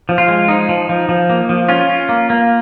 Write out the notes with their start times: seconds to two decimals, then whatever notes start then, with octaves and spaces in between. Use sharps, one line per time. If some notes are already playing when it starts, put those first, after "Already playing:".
0.09 F3
0.18 F4
0.28 G#3
0.48 F3 D#4
0.69 F3
0.89 F3
1.09 F3
1.29 A#3
1.49 F3
1.69 C#4 F4
1.89 C#4
2.09 A#3
2.30 A#3